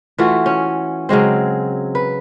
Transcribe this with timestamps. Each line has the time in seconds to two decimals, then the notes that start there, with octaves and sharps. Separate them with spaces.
0.18 E3 A3 F4 F#4
0.46 C#4
1.09 C#3 F#3 G#3 C4
1.95 B4